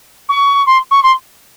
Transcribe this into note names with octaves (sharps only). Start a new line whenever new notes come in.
C#6
C6
C#6
C6